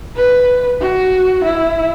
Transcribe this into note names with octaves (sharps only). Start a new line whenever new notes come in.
B4
F#4
E4